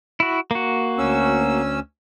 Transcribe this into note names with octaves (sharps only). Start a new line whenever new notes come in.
E4 F#4
A#3 F#4
D2 C#4 E6